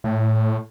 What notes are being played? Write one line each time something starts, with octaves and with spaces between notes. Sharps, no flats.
A2